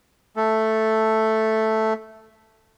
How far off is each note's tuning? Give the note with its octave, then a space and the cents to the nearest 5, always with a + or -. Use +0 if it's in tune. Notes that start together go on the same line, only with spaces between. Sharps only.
A3 +0 A4 +0